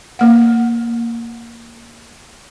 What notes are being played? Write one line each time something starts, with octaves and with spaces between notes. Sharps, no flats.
A#3 F#5